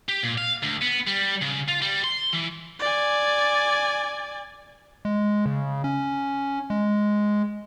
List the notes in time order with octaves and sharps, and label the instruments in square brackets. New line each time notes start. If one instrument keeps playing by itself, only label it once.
[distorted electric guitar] G4
A#2
F5
D2
B3
G3
C#3
F4
G3
C6
E3
[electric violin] D5 G#5
[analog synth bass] G#3
C#3
C#4
G#3